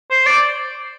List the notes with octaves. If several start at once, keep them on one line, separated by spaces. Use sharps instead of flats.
C5
D5